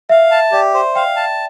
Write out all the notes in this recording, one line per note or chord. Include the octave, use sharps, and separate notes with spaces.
E5 F5
A5
G4 D5
C5
F5 G5
A5